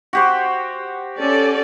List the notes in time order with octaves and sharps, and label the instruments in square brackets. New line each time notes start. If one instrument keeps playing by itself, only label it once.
[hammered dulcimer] F#4 G4 C5
[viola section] C#4 A4 D5